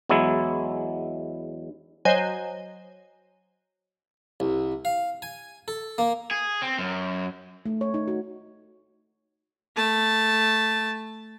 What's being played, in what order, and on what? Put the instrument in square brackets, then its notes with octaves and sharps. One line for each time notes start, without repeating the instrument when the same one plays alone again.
[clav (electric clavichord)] E2 F#3 G#3 E4
[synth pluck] F#3 C5 D#5 G#5
[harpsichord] C2
F5
G#5
A4
A#3
[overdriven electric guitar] G#4
C4
F#2
[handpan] A3
C#5
D#4
F#4
[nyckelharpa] A3 A5